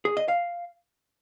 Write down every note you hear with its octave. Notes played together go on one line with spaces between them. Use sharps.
G#4
D#5
F5